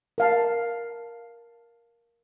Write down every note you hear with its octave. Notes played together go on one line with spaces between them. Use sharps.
A#4 F5 A5